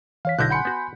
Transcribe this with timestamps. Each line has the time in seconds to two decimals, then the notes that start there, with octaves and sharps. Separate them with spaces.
0.25 E3 C#5 F5 B6
0.39 B1 B2 D3 E4 F#6 G6 A#6
0.50 F#5 G#5 B5 C6 G6 C#7
0.65 B3 F#4